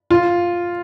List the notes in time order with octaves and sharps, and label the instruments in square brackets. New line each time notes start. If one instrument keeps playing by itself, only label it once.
[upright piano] F4